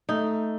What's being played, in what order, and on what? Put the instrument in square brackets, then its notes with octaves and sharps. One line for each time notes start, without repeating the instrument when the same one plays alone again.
[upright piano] A3 [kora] D#4